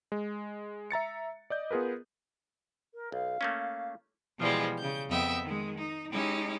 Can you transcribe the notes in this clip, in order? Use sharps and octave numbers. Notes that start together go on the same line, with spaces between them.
G#3
E5 A#5 A6 C#7
D5 D#5 G6
B3 F4 G#4 A#4 B4
A#4
B1 F5
A3 A#3 C#4
B2 E3 F3 G3 G#3
C#3 G6
F2 B3 D#5 E5 G5
D#3 G#3
D#4
G#3 C#4 D#4 E4 G4